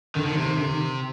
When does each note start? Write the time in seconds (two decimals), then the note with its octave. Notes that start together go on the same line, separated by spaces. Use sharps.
0.15 D3 D#3
0.26 D3
0.31 D#3
0.36 C3
0.46 D#3
0.58 D3
0.70 D#3